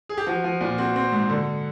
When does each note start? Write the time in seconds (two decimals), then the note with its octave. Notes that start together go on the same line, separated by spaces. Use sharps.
0.09 G#4
0.18 G4
0.27 F3 F#4
0.44 F3
0.61 A#2
0.78 C4 F#4
0.96 C4
1.12 G#2
1.29 D3